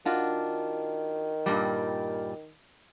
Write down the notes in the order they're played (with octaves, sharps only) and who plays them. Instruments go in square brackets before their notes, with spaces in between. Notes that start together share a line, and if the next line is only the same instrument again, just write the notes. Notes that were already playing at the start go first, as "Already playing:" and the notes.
[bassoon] D#3 [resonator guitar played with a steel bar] D4 F4 F#4
[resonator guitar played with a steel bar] G2 A#2 G3